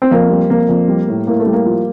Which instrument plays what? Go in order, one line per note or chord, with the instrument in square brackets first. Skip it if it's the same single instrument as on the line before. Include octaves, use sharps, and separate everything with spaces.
[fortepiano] C4
F2 A#3
G3
F2 A#3
F2
G3
A2
A2 A#3
A3
G3
A#3
F3